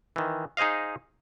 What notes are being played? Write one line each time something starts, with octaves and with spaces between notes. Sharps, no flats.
D#3 E3
D#4 G#4 C5 D#5 F5